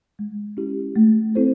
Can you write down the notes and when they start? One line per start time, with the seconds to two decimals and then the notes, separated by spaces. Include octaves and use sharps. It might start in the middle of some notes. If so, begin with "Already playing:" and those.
0.19 G#3
0.57 C#4 E4 G4
0.96 A3
1.35 C4 E4 A4 C5